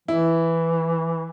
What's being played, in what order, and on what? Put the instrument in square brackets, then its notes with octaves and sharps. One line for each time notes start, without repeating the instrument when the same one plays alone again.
[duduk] E3 [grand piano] E4